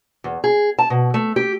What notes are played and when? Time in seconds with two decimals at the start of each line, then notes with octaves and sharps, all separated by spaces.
0.24 E2
0.44 G#4
0.79 A5
0.90 B2
1.14 A3
1.36 G4